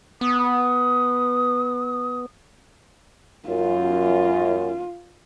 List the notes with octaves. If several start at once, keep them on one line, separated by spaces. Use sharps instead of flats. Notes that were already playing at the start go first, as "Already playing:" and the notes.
B3 D#6
F#2 F4